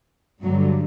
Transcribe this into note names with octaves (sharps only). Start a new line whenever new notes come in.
G2 D3 F#3